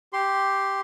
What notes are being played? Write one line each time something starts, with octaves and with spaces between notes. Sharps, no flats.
G4 C6